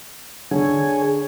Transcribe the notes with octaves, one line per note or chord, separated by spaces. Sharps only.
D3 G#4 C#5 G#5